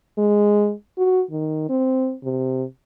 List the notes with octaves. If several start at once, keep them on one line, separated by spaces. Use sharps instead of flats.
G#3
F#4
D#3
C4
C3